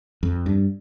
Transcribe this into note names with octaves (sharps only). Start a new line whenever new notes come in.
F2
G2